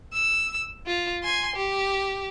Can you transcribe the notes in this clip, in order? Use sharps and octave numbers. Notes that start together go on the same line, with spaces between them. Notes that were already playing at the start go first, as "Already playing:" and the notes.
E6
F4
G#5 C6
G4